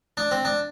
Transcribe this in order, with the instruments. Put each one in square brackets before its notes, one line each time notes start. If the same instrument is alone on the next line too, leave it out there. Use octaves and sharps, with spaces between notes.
[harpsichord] D4
C4
D4